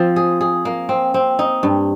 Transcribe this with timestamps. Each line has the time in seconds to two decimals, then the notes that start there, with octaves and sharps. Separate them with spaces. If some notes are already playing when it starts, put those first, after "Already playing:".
Already playing: F3 C4
0.16 G#4
0.41 G#4
0.65 A#3
0.89 C4
1.14 C4
1.39 D#4
1.63 G2